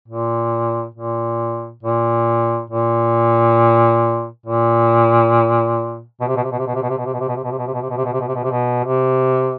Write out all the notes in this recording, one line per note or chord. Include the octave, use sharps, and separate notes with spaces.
A#2
A#2
A#2
A#2
A#2
B2
C3
B2
C3
B2
C3
B2
C3
B2
C3
B2
C3
B2
C3
B2
C3
B2
C3
B2
C3
B2
C3
B2
C3
B2
C3
B2
C3
B2
C3
B2
C3